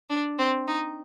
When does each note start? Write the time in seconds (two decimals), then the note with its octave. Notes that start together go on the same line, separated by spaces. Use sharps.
0.10 D4
0.38 C4
0.67 D#4